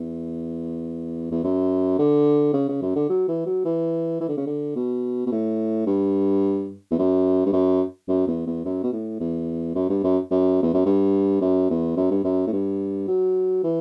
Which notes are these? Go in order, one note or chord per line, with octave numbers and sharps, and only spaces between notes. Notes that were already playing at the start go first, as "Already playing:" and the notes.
Already playing: E2
E2
F#2
D3
C#3
C#3
F#2
D3
F#3
E3
F#3
E3
E3
D3
C#3
D3
B2
B2
A2
G2
E2
F#2
G2
F#2
F#2
E2
E2
F#2
B2
A2
E2
F#2
G2
F#2
F#2
E2
F#2
G2
F#2
E2
F#2
G2
F#2
A2
G2
F#3
E3